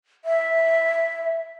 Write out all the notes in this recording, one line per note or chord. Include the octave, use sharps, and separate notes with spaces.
E5